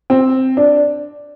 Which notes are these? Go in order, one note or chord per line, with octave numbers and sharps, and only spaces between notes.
C4
D4